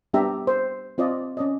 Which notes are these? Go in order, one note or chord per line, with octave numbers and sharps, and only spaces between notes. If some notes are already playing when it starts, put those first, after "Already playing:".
G3 B3 D4 G4 E5 A#5
C5
C4 F4 D5 D#5
C#4 D5 D#5